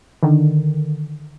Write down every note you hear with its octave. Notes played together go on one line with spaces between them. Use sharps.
D3 D#3